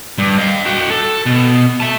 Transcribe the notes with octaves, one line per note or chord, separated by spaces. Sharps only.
G2
D#5 F5
F#4 G5
A4
B2
E5 A5